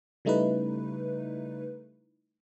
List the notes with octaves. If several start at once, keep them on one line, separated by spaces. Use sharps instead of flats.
C#3 G3 A3 D#4 E4 B4